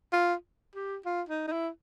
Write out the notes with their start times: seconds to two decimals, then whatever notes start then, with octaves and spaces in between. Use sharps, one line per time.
0.12 F4
0.75 G4
1.05 F4
1.29 D#4
1.47 D#4
1.52 E4